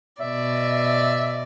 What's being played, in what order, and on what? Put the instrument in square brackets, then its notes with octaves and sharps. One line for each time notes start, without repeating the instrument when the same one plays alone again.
[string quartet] B2 D5 [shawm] E5